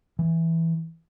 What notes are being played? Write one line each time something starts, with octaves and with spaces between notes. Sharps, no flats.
E3